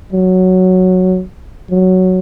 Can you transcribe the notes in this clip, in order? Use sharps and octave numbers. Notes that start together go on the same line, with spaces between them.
F#3
F#3